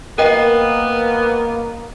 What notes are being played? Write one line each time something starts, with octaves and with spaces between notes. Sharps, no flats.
A#3 B3 A#4 D#5 G5